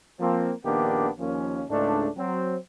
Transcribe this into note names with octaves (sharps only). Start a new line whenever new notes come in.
F3 A#3 C4
A#1 D#3 A#3 B3 D4 G4
D#2 F3 A#3 C#4
C#2 G#2 A3 D4
F#3 C4